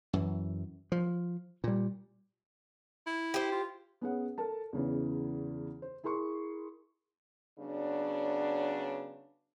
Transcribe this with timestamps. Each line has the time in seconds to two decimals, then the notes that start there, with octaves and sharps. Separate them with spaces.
0.13 F#2 E3
0.92 F3
1.64 A#2 G3
3.07 E4
3.34 G4 C5
3.52 F4
4.01 B3 C#4 G#4 F#5
4.38 A4 A#4 A5
4.73 E2 C#3 E3
5.82 C5
6.04 E4 G#4 A#4 C6 C#6
7.59 C#3 F#3 B3 D4